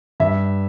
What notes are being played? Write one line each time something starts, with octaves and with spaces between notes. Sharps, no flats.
G2 E5